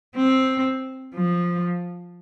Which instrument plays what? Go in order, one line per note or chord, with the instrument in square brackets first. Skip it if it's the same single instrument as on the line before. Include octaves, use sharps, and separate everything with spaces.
[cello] C4
F3